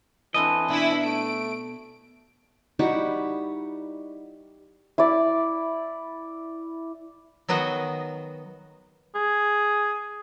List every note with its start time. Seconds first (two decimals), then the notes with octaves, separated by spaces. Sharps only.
0.34 E3 C4 D4 A4 D#5
0.68 B2 D4 E4 E5
1.04 A3 D7
2.79 G3 D#4 E4 F#4
4.98 E4 D5
7.48 D#3 F#3 B3 F#4 D#5
9.15 G#4